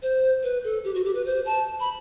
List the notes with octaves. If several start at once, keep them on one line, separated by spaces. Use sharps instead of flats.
C5
B4
A4
G4
F#4
G4
B4
C5
A5
B5